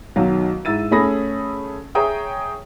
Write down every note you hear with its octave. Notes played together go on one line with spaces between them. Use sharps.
B1 D#3 F#3 F5
G#2 E4 E6 A6 D#7
A3 C#4 G#4 B5 D#6 A#6
G#4 C#5 E5 G5 A#5 D#6